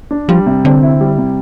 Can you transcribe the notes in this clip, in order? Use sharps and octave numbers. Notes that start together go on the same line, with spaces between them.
D4
F3 G3
C3
D3 C4
E4
G3
C3